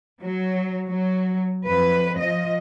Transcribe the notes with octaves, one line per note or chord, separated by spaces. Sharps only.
F#3
F#3
F2 B4
F3 D#5